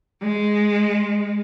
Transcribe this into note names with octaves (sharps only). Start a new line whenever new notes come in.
G#3